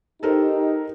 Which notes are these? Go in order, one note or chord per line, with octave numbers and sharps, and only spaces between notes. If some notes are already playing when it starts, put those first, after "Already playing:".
D#4 G4 A4 A#4 C5